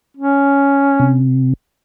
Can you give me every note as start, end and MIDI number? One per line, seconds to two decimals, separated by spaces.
0.17 1.19 61
1.00 1.53 48